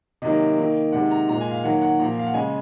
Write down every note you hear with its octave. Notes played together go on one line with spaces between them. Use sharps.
C3 D#3 F#3 A#3 D#5
D#3 A#3
C3 D#3 G#3 F#5
A#5
A#2 G#3 A#5
G#5
F5
D#3 F#3 A#3 F#5
F#5
A#2 F3 A#3 A#5
F5
F#5
C#3 G#3 G#5